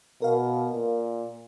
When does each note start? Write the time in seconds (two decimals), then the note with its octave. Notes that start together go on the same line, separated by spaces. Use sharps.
0.22 B2 A#4 F5
0.73 A#2